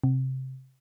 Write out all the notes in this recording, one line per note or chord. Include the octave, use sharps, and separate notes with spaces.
C3